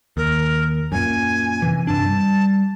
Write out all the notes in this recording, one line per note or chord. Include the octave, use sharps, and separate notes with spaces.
D#2 A#4
F#2 A#2 G#5
C3 E3
G2 C3 D4 A5
G3